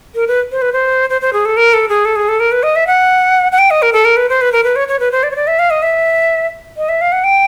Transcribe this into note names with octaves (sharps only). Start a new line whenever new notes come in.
A#4
B4
C5
B4
C5
C5
C5
G#4
A4
A#4
A4
G#4
A4
G#4
A4
A#4
B4
D#5
E5
F#5
F#5
G5
D#5
A#4
A4
A#4
B4
C5
B4
A#4
B4
C#5
C#5
B4
C5
D5
C#5
D5
E5
F5
D#5
E5
D#5
E5
F5
F#5
G5